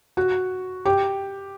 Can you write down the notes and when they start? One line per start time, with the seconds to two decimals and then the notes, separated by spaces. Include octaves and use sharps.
0.17 F#4
0.85 G4